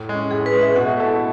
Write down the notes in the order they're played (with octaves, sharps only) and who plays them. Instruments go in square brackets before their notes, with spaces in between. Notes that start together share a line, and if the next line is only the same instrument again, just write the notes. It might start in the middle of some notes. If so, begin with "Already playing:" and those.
Already playing: [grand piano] A2
G#3 C#4
[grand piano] A2 [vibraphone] G#4
[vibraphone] B4
[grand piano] G#3 C#4
[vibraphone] E5
[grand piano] B2 [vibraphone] F#5
[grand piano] A3 E4 A4